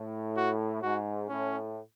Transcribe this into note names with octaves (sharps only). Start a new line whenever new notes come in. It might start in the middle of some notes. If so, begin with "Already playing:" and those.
Already playing: A2
F#4
G#2 F#4
A2 C#4